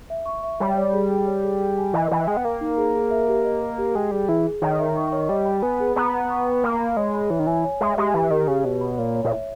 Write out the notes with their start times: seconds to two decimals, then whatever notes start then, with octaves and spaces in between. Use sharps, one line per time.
0.10 E5
0.26 C#6
0.43 E5
0.60 G3 C#5
0.77 C#5
0.93 G#4
1.09 G#4
1.27 C#5
1.43 G#4
1.60 G#4
1.77 G#5
1.93 E3 D#5
2.11 E3 G5
2.28 G#3 G5
2.37 B3
2.45 A#3 A#4
2.61 D#4
2.78 G#4
2.95 G#4
3.11 E5
3.28 G4
3.45 D#5
3.62 A#4
3.78 G4
3.95 G#3 G5
4.11 G3 G#4
4.29 E3 G#4
4.46 G#4
4.62 D#3 C#5
4.79 E5
4.96 C#6
5.12 C#5
5.29 G3 D#5
5.45 B5
5.63 B3 G#5
5.80 G#4
5.96 B3 A#5
6.13 A#5
6.30 C#6
6.46 G5
6.63 A#3 B5
6.80 B5
6.97 G#3 C#5
7.14 B5
7.30 E3 C#5
7.39 D#3
7.47 E3 G#5
7.64 C#5
7.81 G#3 E5
7.97 G#3 G4
8.14 E3 G4
8.31 D#3 G4
8.48 C#3 G4
8.64 B2 C#5
8.81 B5
8.98 A#2 C#5
9.15 C#5
9.24 A#2
9.32 E5